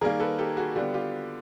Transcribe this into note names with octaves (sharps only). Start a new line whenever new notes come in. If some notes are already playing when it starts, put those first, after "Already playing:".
D#3 G3 A#3 G#4 A#4
A4 B4
G4 A4
F#4 G#4
D3 G3 B3 F4 G4
F4 G4